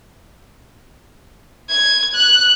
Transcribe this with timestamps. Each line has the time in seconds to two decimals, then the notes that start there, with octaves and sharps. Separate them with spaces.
1.70 G#6
2.15 F#6